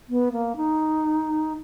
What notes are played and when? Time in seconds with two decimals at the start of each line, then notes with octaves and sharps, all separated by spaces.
0.09 B3
0.33 A#3
0.56 D#4